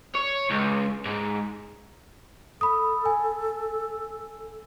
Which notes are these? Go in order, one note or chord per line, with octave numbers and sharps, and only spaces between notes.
C#5
C#2
G#2
A4 B5 D#6
G#5